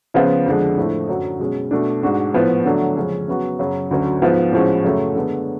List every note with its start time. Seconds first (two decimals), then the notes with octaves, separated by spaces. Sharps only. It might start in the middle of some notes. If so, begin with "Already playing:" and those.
0.14 C#3 F3 B3 F4
0.46 F2 D3 G#3
0.77 A2 F3 A3 D4
1.09 F#2 D3 F#3
1.39 B2 G#3 C#4
1.71 B2 A3 D4
2.03 G#2 G#3 D4 F#4
2.34 A2 F3 B3
2.66 D3 F#3 A3 D4
2.96 F2 C#3 G#3 C#4
3.28 C#3 F#3 B3 F#4
3.59 F#2 C#3 F#3
3.91 D2 D3 F#3 C#4 F#4
4.22 G#2 F3 B3 F4
4.53 A2 F3 G#3 C#4 F#4
4.84 F#2 C#3 F#3 A3
5.15 D3 G#3 B3